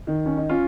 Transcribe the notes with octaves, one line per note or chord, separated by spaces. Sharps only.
D#3
C#4
D#4
C#4 F4